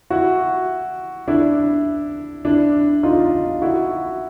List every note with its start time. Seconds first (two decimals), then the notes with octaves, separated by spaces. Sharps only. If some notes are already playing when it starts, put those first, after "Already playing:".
0.10 E4 F#4
1.28 D4 E4
2.45 D4 E4
3.03 D#4 F4
3.62 E4 F#4